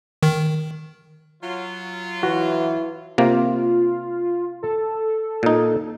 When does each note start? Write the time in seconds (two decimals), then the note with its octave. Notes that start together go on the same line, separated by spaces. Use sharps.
0.23 D#3
1.43 F#3 F4
2.23 E3 E4 F#4
3.18 C3 A#3 F4
4.63 A4
5.43 A#2 D#4